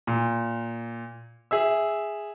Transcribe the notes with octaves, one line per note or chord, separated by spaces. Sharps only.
A#2
G#4 E5 E6